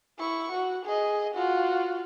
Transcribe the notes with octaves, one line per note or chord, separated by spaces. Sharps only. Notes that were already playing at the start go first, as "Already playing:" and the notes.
E4 C#6
F#4
G#4 D#5
F4 F#4